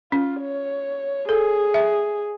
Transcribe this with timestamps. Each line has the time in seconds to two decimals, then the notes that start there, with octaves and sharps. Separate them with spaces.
0.12 C#4 F4
0.41 C#5
1.29 G#4 A4
1.74 E5